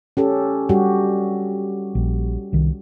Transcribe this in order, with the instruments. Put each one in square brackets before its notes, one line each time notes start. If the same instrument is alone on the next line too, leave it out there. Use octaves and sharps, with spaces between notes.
[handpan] C#4 G4 A4
G3 F#4 G4
[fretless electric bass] A#1
C2 D#3